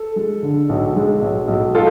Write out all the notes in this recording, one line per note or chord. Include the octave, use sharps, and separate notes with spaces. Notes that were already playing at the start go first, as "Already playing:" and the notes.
Already playing: A4
G#3
D3
B1
G#3
B1
B1
F4 A4